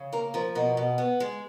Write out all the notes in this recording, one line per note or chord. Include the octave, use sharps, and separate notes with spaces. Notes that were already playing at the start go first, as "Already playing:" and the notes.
Already playing: C#3
A#3 A#4
F3 A#4
B2 A#4
B2
B3
G#3